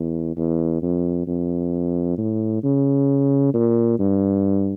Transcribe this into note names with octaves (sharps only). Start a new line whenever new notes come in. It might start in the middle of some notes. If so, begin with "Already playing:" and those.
Already playing: E2
E2
F2
F2
A2
C#3
A#2
G2